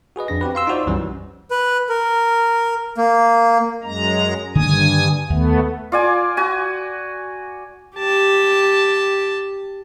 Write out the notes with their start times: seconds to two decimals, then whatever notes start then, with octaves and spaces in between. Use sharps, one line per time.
0.16 F#4 G#4 B4 D#5
0.28 F2 D4 A#6
0.41 C4 F#4 G4 B4
0.55 F5 C6 E6
0.67 D#4 F4 F#4 C5 D5
0.86 C2 F#2 E3 G3 C#4
1.51 B4
1.89 A#4
2.98 A#3
3.84 F#2 G#3 A#5
4.55 G2 D3 D#3 A#3 G#5 D#6
5.30 D#2 A3 B3
5.92 F4 D5 G#5
6.37 F#4 G#5
7.97 G4 A5